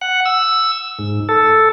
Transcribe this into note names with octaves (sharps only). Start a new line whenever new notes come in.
F#5
E6
G#2
A4